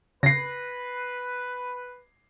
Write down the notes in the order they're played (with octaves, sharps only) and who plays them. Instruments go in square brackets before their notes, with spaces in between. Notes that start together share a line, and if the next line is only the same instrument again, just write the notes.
[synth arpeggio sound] C#3 [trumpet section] B4 [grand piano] A#6 C7